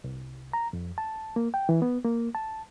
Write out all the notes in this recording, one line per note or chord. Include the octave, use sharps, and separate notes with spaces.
C2
A#5
F2
A5
A#3
G5
E3
B3
A#3
A5